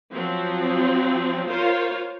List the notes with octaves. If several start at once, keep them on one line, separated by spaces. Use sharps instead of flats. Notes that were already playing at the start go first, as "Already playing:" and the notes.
F3 F#3 C4
F4 A#4 C5 C#5 F5